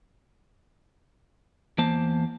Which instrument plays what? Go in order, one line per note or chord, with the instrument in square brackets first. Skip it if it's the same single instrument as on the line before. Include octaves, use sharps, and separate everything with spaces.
[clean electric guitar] E2 A#3 C5 A5